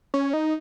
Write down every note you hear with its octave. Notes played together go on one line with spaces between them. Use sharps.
C#4
D#4